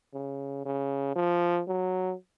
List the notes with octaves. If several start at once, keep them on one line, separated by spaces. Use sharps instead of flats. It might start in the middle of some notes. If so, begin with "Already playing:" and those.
C#3
C#3
F3
F#3